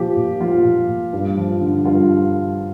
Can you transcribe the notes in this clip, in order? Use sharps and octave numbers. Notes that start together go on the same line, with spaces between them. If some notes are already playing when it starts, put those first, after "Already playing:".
Already playing: A#2 F3 G4
A#2
F3 F4
A#2
A#2
G2
F3
D3
G2 F4